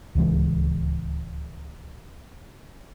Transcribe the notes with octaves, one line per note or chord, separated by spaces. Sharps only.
D1 C#2 E3 G#3